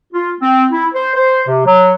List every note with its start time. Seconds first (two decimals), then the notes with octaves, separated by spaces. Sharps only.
0.13 F4
0.41 C4
0.72 E4
0.94 C5
1.16 C5
1.47 C3
1.66 F#3